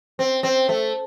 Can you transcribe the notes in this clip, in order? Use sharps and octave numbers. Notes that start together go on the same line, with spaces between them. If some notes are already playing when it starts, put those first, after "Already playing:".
C4
C4
A3